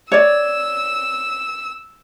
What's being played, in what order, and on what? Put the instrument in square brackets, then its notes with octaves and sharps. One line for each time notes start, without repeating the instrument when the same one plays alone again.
[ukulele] C#5 D5 [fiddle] E6